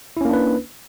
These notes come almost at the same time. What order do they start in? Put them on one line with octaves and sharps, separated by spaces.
E4 C#4 A#3 D4 B4